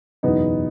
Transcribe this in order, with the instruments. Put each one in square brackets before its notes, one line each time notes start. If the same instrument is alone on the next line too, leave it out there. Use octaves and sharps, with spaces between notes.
[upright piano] F#1 E2 B2 B3 D#4